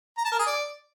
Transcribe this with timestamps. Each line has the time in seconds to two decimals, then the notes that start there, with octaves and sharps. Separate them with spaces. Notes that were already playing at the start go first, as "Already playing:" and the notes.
0.17 A#5
0.25 A5
0.32 A#4
0.39 G#4
0.47 D5